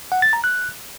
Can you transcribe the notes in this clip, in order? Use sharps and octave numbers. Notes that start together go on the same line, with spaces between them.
F#5
A6
A#5
F#6